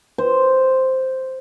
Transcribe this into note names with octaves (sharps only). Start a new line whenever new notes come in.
C5